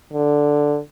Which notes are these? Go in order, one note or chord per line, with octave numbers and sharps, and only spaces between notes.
D3